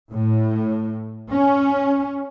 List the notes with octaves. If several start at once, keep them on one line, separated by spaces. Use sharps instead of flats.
A2
C#4